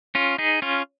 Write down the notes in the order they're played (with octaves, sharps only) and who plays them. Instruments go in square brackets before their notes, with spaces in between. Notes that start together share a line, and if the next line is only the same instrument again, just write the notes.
[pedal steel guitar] C#4 F4
D#4 G#4
C#4 F4